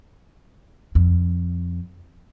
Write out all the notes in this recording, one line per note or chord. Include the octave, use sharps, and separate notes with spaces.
F2